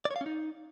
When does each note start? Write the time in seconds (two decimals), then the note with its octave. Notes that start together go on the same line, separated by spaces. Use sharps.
0.05 D5
0.11 C#5
0.16 F5
0.21 C#4
0.26 D#4